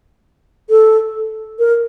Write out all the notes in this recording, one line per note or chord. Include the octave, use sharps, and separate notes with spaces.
A4
A#4